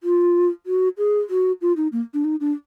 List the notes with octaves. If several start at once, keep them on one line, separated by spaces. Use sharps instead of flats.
F4
F#4
G#4
F#4
F4
D#4
A#3
D4
D#4
D4